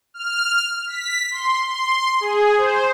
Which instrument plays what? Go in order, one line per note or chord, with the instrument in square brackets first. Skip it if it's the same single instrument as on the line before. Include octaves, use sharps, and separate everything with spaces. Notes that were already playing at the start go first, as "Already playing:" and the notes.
[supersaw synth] F6
B6
C6
C6
G#4
C5